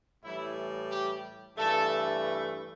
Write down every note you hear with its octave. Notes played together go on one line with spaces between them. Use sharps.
A2 E3 G3 E4
G4
G2 E3 A3 A4